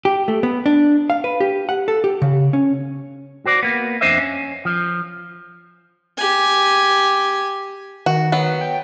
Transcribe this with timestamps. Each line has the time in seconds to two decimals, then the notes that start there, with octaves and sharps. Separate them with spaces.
0.05 G4
0.28 A3
0.43 B3
0.66 D4
1.10 F5
1.24 B4
1.40 G4
1.69 F#5
1.88 A4
2.04 G4
2.22 C#3
2.53 C#4
3.46 F#4 C5 D5
3.63 A#3 B3
4.01 F2 D4 C5 D#5 E5
4.18 C#4
4.65 F3
6.17 G4 G#5
8.06 D#3 F#4
8.32 F#3 B3
8.61 G5